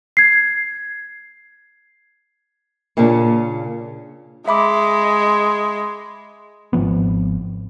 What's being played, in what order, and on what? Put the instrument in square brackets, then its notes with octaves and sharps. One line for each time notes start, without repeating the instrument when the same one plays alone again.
[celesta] G#6 C7
[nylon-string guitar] A#2 C#3 A#3 C#4 D4
[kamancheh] G#3 [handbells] E5 B5 D6
[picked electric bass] G#1 F3 B3